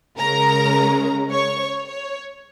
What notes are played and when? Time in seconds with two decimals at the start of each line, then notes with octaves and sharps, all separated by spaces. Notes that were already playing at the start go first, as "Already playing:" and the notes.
0.17 C#3 G#3 C#4 A#4 A#5
1.31 C#5 C#6
1.60 C#5
1.88 C#5